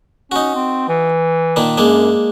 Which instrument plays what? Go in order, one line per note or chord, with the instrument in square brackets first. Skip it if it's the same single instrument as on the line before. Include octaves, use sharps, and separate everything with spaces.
[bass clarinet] C#4 [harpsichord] D#4 F#4
[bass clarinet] C4
E3
[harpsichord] A#2 D#3 D4
[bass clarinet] F#2 [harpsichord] G#3 A#3 D4